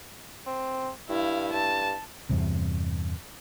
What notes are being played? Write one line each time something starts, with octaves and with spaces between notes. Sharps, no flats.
C4
G2 E4 F5
G2 A5
E2 G2 C3